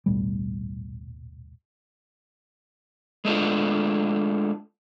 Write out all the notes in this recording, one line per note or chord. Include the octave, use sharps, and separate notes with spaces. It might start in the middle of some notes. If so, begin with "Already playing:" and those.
D#1 B1 A2 G3
G#3 A3 D4 F4